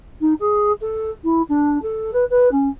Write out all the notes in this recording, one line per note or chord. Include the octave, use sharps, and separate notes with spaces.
D#4
G#4
A4
E4
D4
A4
B4
B4
C#4